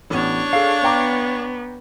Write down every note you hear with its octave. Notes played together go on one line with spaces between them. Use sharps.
A1 B3 D4 C#5
G#4 A4 F5
B3 G5 A#5 D6